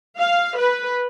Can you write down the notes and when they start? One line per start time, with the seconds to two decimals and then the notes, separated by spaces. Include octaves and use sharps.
0.19 F5
0.58 B4